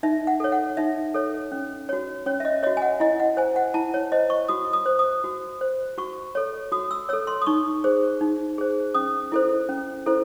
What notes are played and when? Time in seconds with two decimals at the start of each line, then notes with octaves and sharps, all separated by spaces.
0.03 D#4 E5
0.27 F#5
0.40 A4 C#5
0.52 F#5
0.77 D#4 E5
1.14 A4 C#5
1.52 C#4
1.89 F#4 C#5
2.26 C#4 C#5
2.40 E5
2.45 D#5
2.63 F#4 C#5 D#5
2.77 G#5
2.82 F#5
3.00 E4 D#5
3.20 F#5
3.37 C5 G#5
3.56 F#5
3.74 E4 A5
3.94 C#5
4.12 C5 D#5
4.30 C#6
4.48 F#4 D#6
4.73 D#6
4.86 C5
4.99 D#6
5.24 F#4
5.61 C5
5.98 F#4 C#6
6.35 A4 C#5
6.72 F#4 D#6
6.91 E6
7.09 A4 C#5 E6
7.27 C6
7.42 D#6
7.46 D#4 C#6
7.84 G#4 C5
8.21 D#4
8.58 G#4 C5
8.94 C#4 D#6
9.32 E4 A4 C5
9.69 C#4
10.06 E4 A4 C5